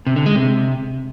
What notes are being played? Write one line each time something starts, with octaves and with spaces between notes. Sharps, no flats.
C3
D3
G#3
C3